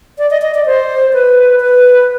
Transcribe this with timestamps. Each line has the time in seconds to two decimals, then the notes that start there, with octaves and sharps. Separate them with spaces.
0.18 D5
0.31 D#5
0.42 D#5
0.54 D5
0.66 C5
1.13 B4
1.60 B4